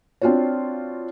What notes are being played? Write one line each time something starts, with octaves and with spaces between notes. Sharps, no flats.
C4 D4 F4 F#4 C#5